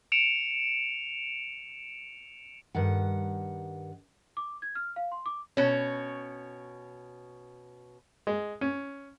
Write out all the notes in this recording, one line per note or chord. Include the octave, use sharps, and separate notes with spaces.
C#7 D7 E7 F7
G2 D#3 F#5
D6
G#6
F6
F5
C6
D6
B2 C#4
G#3
C#4